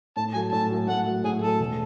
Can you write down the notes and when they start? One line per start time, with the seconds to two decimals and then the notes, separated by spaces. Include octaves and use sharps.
0.16 A2 A5
0.34 F#3 A3 G#5
0.52 A2 A5
0.70 F#3 A3
0.88 A2 F#5
1.06 F#3 A3
1.24 A2 G#4
1.42 F#3 A3 A4
1.60 E1